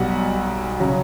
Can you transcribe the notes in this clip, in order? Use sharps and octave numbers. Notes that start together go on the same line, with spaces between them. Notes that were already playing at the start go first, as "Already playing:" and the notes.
Already playing: B1 B2 G3 F#5
C#3 F#3